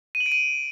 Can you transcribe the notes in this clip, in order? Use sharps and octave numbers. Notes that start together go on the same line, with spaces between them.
D#7
F#7
D7
D#7